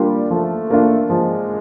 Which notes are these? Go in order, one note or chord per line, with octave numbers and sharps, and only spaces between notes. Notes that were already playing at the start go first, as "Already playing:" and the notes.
Already playing: G3 A#3 D4 F4
F3 A3
A#3 D4 F4
F3 G#3